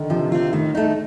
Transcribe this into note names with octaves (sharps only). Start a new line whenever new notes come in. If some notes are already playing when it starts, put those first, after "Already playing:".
Already playing: D3 D#3
C3 F3
C4 F4
A2 D#3
A3 D#4